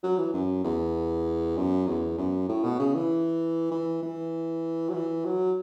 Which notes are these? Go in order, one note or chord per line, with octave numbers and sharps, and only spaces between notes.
F#3
E3
F#2
E2
F#2
E2
F#2
A2
B2
C#3
E3
E3
E3
F#3
E3
F#3